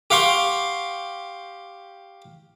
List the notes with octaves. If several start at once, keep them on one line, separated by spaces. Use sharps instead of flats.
G4 F5 F#5 C6 C#6